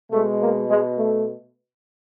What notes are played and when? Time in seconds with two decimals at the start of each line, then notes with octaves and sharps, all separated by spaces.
0.11 B2 G#3 A3
0.39 A#3
0.69 G#3
0.98 A3